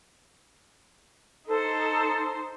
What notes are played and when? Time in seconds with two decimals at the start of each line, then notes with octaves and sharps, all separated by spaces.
1.48 D#4 A4 C5